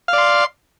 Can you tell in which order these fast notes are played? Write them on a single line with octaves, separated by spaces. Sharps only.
F5 D5 C6